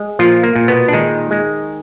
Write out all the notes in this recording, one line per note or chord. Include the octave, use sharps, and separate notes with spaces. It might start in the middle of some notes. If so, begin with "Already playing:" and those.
Already playing: G#3
A#2 F3 F4
A#3
A#2
B2 B3
D4
D#3 G#3 D#4
G#3